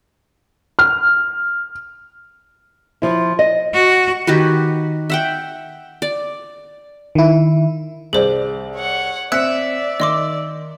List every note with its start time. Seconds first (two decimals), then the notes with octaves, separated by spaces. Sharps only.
0.79 F6
3.02 F3 E4
3.39 D#5
3.74 F#4
4.27 D#3 F#4 G4 B4
5.10 E5 F#5 G5
6.02 D5
7.15 D#3 E4
8.13 C2 G#4 C5 D5
8.76 C#5 F#5
9.32 C4 D5 E5 F#6 C#7
10.00 D#3 D#5 C6 D6